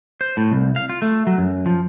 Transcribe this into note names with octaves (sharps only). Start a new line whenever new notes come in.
C5
A2
C2
F5
F4
A3
F#3
F#2
F3